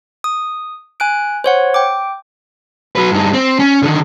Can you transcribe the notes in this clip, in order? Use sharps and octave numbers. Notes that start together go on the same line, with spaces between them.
D#6
G#5 F#6 D7
C5 C#5 F#5
G5 D6
F#3 B4
G2 D#4
C4
C#4
D3 D#3